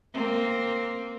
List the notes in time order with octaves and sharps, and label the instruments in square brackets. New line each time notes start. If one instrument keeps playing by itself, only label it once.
[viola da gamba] A#3 C4